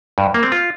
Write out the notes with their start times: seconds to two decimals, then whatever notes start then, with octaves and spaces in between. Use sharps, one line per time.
0.18 G2
0.34 A#3
0.43 C4
0.52 F4